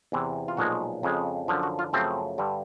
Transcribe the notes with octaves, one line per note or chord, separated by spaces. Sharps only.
E2 C3 E3
F4
B1 A#2 F3 G#3 F#4
F2 C#3 F3 G#3
F#2 D3 F3
F#4
F4
F#2 C#3 F3 A3 C4
G2 D3 G3